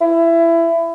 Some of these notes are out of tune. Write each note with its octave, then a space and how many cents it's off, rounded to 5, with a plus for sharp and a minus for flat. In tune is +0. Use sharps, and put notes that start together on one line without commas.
E4 +20